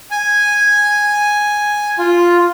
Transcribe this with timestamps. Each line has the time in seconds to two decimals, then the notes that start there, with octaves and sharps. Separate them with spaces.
0.11 G#5
1.98 F4